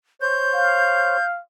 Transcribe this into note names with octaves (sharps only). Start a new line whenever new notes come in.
C5 C#5 G6
F5